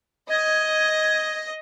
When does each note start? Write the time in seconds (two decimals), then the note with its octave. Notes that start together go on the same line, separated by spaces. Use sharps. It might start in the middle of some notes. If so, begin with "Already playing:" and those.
0.30 D#5 G#6